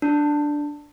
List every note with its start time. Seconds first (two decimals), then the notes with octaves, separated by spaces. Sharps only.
0.02 D4